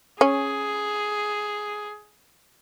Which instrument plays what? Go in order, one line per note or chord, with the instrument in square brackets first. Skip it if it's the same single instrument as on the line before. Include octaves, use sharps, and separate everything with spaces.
[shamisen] C#4 [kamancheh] G#4